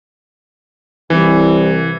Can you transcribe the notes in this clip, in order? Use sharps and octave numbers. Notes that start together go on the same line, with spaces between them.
C2 E3